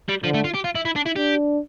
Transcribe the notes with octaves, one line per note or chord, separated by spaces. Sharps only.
G3
D3 F3
A3
F4
G4
F4
E4
E4
D4
E4
D4 G4